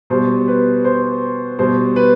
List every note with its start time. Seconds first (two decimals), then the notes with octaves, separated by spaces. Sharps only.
0.10 B2 G3 C5
0.48 B4
0.85 C5
1.59 B2 G3 C5
1.96 B4